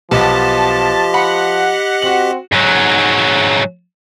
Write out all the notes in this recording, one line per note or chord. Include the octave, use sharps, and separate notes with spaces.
B1 F3 B3 G4 D#5 A5 B6
F#5 B5
C4 F#4 F#7
G#2 F#3